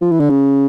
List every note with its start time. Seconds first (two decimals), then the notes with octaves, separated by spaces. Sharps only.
0.01 F3
0.11 E3
0.20 D3
0.30 C#3